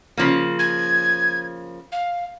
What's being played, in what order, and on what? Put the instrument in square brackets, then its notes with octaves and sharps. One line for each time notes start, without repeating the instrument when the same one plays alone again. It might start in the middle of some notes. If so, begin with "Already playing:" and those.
[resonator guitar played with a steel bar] C#3 F3 A#3
[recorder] G#6
F5